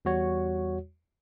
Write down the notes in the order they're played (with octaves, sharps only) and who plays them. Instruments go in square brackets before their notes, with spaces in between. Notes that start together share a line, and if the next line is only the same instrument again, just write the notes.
[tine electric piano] E2 G3 F#4 C#5